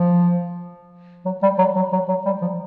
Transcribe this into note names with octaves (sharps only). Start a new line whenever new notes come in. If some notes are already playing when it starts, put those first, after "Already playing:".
Already playing: F3
F#3
G3
F#3
F#3
F#3
F#3
G3
F3